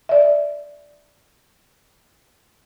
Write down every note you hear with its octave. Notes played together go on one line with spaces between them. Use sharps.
D5 E5